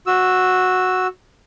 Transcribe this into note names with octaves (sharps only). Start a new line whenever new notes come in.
F#4 E6